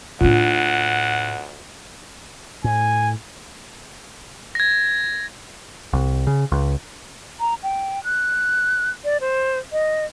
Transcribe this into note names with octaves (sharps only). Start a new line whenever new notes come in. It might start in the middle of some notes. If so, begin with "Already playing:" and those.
D2 A2 D4 F4 F#5
A2 G#5
G#6 A#6
C2
C#3
C#2
A#5
G5
F#6
D5
C5
D#5